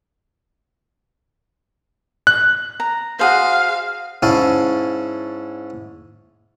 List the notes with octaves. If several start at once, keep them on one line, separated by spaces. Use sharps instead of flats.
F#6
A#5
F#4 G#4 C5 F5
G#2 C#4 E4 F5 A5